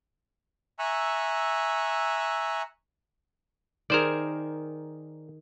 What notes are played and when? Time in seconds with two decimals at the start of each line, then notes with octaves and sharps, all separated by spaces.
0.79 E5 G#5 A#5 C#6 E6 F#6
3.90 D#3 G#4 A#4 C5 D5